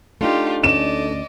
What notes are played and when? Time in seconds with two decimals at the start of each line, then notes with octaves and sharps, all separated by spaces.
0.21 A3 D4 D#4 F4 G4
0.63 D2 C#4 D5 D#5 E7